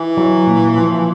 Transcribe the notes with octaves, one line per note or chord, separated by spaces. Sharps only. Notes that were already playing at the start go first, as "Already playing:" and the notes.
Already playing: E3
F#3
A#2
F3